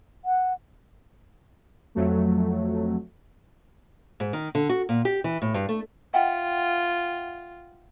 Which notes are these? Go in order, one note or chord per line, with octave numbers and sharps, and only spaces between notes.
F#5
F2 F#3 A3
G#2
D#3
D3
F#4
A#2
G4
E3
A2
G2
A3
F4 E5 F#5 G5